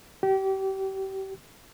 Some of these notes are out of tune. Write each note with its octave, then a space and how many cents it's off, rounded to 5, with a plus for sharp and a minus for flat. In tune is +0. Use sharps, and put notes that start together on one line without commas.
G4 -30